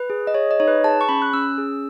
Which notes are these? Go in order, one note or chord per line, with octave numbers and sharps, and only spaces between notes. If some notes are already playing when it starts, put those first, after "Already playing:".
Already playing: B4
G#4
D#5
G#4 C#5
D#5
D#4 C#5
B4
G#4 A5
C#6
C#4 B5
F#6
C#4 E6
G#4